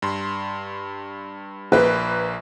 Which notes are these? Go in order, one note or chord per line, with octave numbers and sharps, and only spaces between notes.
G2 C6
A#1 A#3 B4